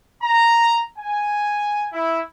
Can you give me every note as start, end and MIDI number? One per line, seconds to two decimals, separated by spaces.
0.22 0.80 82
0.98 1.87 80
1.93 2.20 64